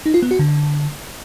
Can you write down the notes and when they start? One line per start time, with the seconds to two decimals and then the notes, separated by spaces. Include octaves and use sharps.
0.06 D#4
0.14 F4
0.22 B3
0.31 F#4
0.39 D3